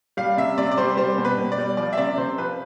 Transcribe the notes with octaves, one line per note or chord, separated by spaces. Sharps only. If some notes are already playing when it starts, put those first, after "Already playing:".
G3 F5
C3 E5
C3 D5
D5
G3 C5
G3 C5
B2
B4
B2
D5
G3
F3 D5
E5
C3 D5
C3 C5
F3 B4